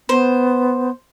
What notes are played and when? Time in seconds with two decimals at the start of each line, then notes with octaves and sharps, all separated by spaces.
0.09 B3 C5